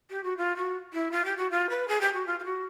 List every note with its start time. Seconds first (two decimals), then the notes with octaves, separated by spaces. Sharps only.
0.10 G4
0.23 F#4
0.37 F4
0.56 F#4
0.93 E4
1.11 F4
1.24 G4
1.37 F#4
1.50 F4
1.69 B4
1.87 G#4
2.00 G4
2.13 F#4
2.26 F4
2.39 F4
2.44 F#4